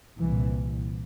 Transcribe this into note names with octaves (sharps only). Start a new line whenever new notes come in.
C2 A#2 E3